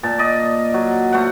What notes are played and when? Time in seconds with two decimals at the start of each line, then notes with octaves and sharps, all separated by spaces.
0.03 A#2 A5
0.18 D5 D#5
0.74 F#3
1.12 A3 C5 F#5